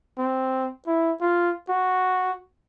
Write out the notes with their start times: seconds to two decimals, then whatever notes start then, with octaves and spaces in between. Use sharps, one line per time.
0.18 C4
0.87 E4
1.21 F4
1.69 F#4